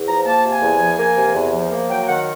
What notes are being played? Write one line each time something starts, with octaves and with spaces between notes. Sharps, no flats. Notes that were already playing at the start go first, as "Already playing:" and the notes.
Already playing: E2
F3 A#5
A#3 A5
C3
G#5
E2
F3
A#3
C3
E2
F3
A#3
F#3 G5
D#3 F#5